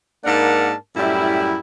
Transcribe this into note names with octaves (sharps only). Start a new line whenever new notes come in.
G#2 A#3 D4 A#4 F#5 A5
F#2 A2 G3 E4